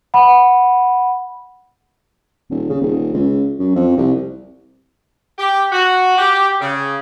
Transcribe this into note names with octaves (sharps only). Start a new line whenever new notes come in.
F#5 B5
D#1
C#3
D#1
C#2
F#2
F2
C2
G4
F#4
G4
C#3